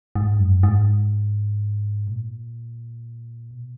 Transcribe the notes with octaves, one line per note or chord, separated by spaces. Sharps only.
G#2
F#2
G#2
A#2
B2